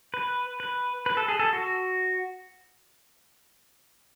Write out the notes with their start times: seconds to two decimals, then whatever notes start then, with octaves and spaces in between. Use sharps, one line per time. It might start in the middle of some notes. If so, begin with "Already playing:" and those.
0.14 B4
0.60 B4
1.06 B4
1.17 A4
1.28 G#4
1.39 A4
1.53 F#4